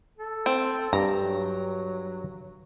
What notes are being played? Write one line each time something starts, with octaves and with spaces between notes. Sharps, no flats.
A4
C4
G2 A#5
F#3